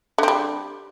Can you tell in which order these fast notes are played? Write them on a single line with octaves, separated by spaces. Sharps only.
D3 C4 G3